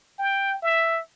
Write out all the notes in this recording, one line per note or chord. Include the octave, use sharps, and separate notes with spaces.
G5
E5